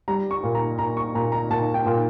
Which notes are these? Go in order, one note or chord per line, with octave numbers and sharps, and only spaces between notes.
G3 A#5
C#6
A#2
A#5
A#2 A#5
C#6
A#2 A#5
A#5
A#2 A5
G5
A#2